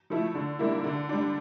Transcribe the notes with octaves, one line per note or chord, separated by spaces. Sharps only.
F3 A3 E4
D3
G3 A#3 E4
D3
G3 D4